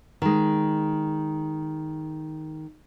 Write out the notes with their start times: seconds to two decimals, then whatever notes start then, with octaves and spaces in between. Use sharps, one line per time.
0.22 D#3 G#3